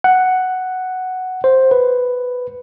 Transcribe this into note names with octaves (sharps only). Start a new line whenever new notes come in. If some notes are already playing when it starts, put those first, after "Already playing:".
F#5
C5
B4